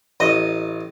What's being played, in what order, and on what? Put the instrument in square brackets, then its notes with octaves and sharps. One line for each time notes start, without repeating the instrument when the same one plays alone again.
[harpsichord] A1 D#5